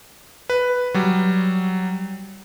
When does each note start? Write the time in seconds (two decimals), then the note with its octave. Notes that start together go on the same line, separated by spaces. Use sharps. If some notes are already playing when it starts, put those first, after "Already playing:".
0.50 B4
0.94 F#3 G3